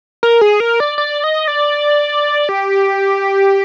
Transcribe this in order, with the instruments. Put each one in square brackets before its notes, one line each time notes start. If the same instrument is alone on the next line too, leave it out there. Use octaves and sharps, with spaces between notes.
[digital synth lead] A#4
G#4
A#4
D5
D5
D#5
D5
G4